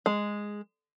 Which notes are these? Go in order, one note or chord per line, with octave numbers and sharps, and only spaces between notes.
G#3